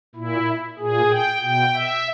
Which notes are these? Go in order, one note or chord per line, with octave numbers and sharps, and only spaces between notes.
A#2 E4
A#2 G#4
G5
B2 G5
E5